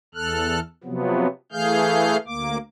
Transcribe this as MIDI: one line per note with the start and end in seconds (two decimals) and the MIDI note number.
0.15 0.60 40
0.15 0.60 69
0.15 0.60 89
0.15 0.60 90
0.84 1.27 48
0.84 1.27 53
0.84 1.27 54
0.84 1.27 59
1.52 2.17 52
1.52 2.17 57
1.52 2.17 68
1.52 2.17 77
1.52 2.17 89
1.52 2.17 91
2.26 2.58 38
2.26 2.58 58
2.26 2.58 86